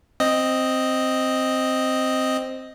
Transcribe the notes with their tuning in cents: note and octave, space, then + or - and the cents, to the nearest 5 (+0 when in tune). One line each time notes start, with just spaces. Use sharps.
C4 +0 D#5 +0